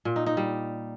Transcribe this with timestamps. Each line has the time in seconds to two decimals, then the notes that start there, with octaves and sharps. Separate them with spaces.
0.05 A#2
0.16 D#4
0.26 D#4
0.37 G3